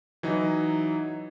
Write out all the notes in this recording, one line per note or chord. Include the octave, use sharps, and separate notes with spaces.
E3 F#3 D#4